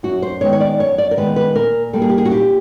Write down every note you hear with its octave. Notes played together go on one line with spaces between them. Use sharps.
F#2 F#4
C5
D#3 G#3 B3 C#5
C#5
D5
F#2 C#5
D5
A#4
D#3 G#3 B3 B4
B4
A#2 A#4
G3 A#3 A4
G#4
G4
G#4
F#4
A#2 G4